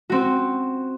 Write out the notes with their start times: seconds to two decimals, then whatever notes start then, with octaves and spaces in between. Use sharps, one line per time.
0.10 C4 F#4